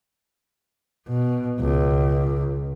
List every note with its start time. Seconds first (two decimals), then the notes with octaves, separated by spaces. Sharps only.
1.07 B2
1.60 C#2